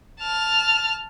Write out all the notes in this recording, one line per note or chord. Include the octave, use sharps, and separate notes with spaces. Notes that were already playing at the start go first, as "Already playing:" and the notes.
A5 F6